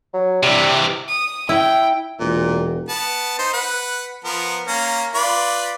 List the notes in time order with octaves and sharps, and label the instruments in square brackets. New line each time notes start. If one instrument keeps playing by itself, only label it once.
[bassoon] F#3
[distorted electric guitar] C3 E3 [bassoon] G3
[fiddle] D#6
[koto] E4 [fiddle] G5
[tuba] E1 [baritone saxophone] A#2
[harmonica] B3 A5
D#4 C5
B4 F#5
F3 B3 A#4
A#3 C#4 A#5
F4 B4 D5